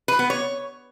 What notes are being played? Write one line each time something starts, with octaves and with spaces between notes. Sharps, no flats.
B4
B3
C#5